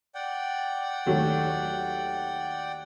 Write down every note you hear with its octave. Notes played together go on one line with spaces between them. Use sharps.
D5 F#5 G5
D#2 F#3 A3